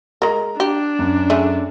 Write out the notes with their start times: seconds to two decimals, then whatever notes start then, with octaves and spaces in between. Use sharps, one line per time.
0.22 G#3 A#4 A#5
0.60 D4 G4
0.99 F#2
1.30 D3 A3 G#4